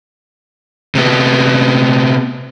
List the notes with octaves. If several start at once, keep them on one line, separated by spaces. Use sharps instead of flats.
C3 B3